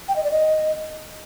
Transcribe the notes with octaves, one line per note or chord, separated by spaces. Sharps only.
G5
D#5
D5
D#5